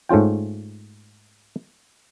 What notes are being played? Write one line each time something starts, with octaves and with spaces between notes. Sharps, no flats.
G#2 A3 C#4 F4 G5